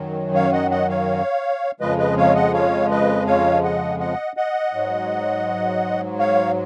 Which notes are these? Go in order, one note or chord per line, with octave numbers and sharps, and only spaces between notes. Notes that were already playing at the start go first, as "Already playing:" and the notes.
Already playing: F#2 D#3 F#3
C#5 F5
D#5 F#5
D#5 F#5
C#5 F5
F2 C#3 F3 G#3 B4 D#5
B4 D#5
C#5 F5
D#5 F#5
C#5 F5
B4 D#5
C#5 F5
D#5 F#5
D#5 F#5
D#5 F#5
G#2 F#3
C#5 F5